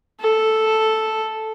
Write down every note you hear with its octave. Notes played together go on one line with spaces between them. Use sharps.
A4